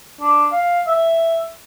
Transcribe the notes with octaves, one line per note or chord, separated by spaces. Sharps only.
D4
F5
E5